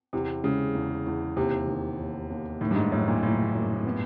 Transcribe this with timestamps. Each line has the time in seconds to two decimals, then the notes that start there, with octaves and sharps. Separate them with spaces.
0.13 E2 C3
0.43 C#3 G#3
0.75 E2
1.07 E2
1.37 D#2 C3
1.67 D#3
1.99 D#2
2.30 D#2
2.61 A2 D#3
2.71 G2
2.76 G#2
2.91 F#2 A2
3.08 A#2
3.23 F#1 A2
3.53 F#2
3.85 B3